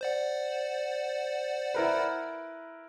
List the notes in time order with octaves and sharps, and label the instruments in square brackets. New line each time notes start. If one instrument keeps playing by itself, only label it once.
[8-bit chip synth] C5 D5 F#5
[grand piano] E4 A#4 B4